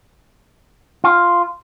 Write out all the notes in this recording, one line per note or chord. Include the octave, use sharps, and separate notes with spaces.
F4